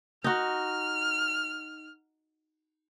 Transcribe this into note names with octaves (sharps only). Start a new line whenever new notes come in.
D#4 F#4 F6